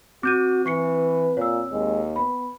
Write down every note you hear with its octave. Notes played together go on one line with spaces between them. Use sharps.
C4 F#4 D6 G6 D#7
E3 B4 C#6 C7 C#7
A#2 C#5 E6
D#2 G#3
B3 B5